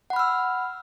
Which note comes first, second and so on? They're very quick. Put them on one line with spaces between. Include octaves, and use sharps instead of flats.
F#5 B5 F6 E6